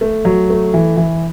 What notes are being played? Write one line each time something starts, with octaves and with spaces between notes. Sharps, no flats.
A3
F#3
A3
E3
E3